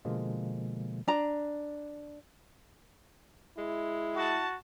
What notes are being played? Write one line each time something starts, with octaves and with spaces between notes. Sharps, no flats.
B2 D3 F3 G#3 A#3
D4 A#5
G#3 E4
F#4 A5